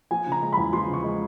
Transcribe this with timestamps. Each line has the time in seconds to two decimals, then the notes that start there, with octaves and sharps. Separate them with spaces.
0.11 F3 G#5
0.27 C#3
0.32 A#5
0.42 G#3
0.53 E2 B5
0.73 F3 C6
0.89 C#3 C#6
1.04 G#3